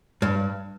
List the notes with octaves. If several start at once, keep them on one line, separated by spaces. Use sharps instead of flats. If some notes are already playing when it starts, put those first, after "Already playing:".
G2